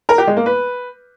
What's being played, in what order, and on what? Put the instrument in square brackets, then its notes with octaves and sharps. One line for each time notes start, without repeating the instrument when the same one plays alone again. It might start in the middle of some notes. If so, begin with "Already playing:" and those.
[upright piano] A#4
G4
G#3
A#3
B4